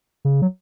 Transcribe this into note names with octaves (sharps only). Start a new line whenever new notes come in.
C#3
F#3